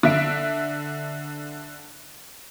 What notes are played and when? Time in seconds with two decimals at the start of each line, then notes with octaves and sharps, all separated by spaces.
0.03 D3 E5 D7